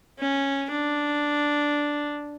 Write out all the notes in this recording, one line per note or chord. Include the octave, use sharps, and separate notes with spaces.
C#4
D4